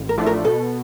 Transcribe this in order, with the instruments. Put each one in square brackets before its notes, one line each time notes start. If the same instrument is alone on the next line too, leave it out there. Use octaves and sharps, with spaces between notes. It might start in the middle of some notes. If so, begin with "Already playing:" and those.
Already playing: [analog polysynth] A1
[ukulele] A#4
[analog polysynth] A2 F3 A3 D4
[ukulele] A#4
[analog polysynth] B2 [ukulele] A4